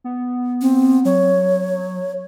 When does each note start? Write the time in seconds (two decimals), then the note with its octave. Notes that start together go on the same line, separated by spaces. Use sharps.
0.04 B3
0.61 C4
1.05 F#3 C#5